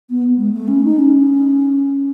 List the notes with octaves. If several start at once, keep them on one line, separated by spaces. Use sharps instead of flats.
B3
G#3
A3
C#4
D#4
C#4